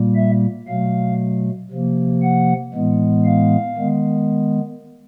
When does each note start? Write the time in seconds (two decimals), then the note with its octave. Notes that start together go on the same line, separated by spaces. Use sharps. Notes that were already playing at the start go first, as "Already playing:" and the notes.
Already playing: A#2 G3 A#3
0.15 E5
0.67 B2 F#3 A3 F5
1.71 C3 F3 A#3
2.23 F#5
2.74 A2 E3 G#3 B3
3.25 F5
3.77 D#3 G#3 B3